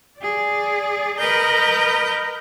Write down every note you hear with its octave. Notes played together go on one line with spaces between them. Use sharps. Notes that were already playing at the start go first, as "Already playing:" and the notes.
G#4 D5
A#4 B4 D#5 A#5 G6